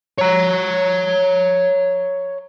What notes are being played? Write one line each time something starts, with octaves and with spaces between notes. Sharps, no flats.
C#5 A#5